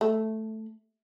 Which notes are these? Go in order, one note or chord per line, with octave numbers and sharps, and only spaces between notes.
A3